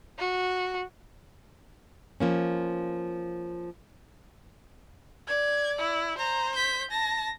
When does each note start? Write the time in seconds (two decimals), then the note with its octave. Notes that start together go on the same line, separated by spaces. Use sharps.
0.19 F#4
2.20 F3 A#3 C#4
5.28 D5 G#6
5.78 E4
6.18 C5 A#5
6.54 G6 B6
6.91 A5 A#6